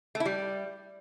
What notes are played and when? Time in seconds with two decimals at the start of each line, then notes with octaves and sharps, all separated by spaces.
0.15 A3
0.20 E4
0.26 G3